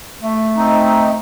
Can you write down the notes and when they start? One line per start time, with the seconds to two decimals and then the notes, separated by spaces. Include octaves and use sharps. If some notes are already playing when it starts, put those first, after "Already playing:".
0.22 A3
0.57 C4 D#4